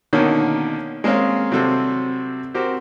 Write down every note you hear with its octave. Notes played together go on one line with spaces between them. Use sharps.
B2 D3 D#3 A#3 C#4
G#3 A#3 C4 C#4 F5
C3 F#3 G3 C4 A4
C4 F#4 G4 A#4 C5